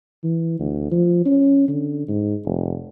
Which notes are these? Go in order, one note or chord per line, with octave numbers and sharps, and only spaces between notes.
E3
D2
F3
C#4
D3
G#2
F1